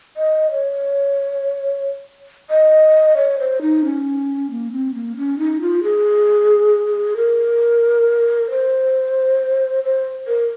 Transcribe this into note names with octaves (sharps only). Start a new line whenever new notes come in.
D#5
C#5
D#5
C#5
C5
D#4
C#4
A#3
C4
A#3
C#4
D#4
F4
G#4
A#4
C5
C5
A#4